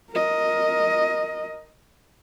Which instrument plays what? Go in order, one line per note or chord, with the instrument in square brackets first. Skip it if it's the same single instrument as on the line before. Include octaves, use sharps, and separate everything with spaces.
[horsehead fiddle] A#4 D#5